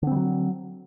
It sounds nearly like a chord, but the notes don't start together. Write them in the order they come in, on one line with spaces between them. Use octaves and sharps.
D3 C4 G3 F#3